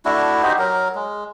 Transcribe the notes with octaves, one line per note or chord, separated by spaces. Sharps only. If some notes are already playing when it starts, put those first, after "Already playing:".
A3 D4 E4 F#4
D#4 F#4 G4 C5
F#3 A#4
G#3